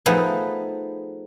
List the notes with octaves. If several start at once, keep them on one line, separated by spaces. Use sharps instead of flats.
F3 A3 B3 D#4 G#4 B4